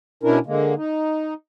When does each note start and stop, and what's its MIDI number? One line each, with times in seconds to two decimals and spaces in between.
0.23 0.39 47
0.23 0.39 61
0.23 0.39 62
0.23 0.39 64
0.23 0.39 70
0.46 0.74 50
0.46 0.74 56
0.46 0.74 58
0.77 1.34 63